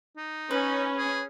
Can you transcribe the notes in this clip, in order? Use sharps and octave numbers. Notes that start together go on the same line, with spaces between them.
D#4
C#4 B4
G#4